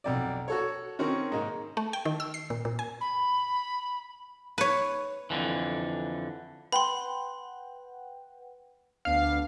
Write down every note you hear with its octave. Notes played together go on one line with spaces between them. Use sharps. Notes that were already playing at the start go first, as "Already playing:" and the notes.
B1 F2 D5
F#4 A4 C#5
D#3 C4 C#4 F#4 A#4
G#2 A#3 D#5
A3
G5
D#3
E6
C7
A#2
A#2
G#5
B5
B4 C#5
F2 A#2 D3 E3
B4 F#5 G5 B5 C6
D2 B3 D4 F5